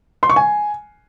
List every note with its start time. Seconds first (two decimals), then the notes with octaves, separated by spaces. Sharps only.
0.23 C6
0.30 C#6
0.36 G#5